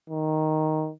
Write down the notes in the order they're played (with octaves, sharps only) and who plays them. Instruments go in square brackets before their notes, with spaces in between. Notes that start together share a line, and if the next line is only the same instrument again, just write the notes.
[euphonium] D#3